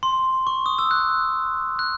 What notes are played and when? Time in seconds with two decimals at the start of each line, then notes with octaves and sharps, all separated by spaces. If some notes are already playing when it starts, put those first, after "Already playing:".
0.03 C6
0.47 C#6
0.66 D#6
0.79 E6
0.91 F#6
1.79 F#6